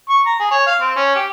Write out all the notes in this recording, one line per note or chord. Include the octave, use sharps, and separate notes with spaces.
C#6
A#5
G#4
C#5
F5
C4
C#4
G4